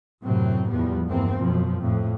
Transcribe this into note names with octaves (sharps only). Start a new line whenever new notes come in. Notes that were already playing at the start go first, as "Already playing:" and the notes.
F#2 A2 C3 F#3 C4
E2 F3 G3 B3
E2 G2 E3 A#3 C4
F#2 B2 F3
F2 A2